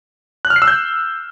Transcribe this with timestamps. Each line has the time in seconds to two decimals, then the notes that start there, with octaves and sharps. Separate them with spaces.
0.45 F#6
0.50 F6
0.56 C7
0.62 E6
0.68 G6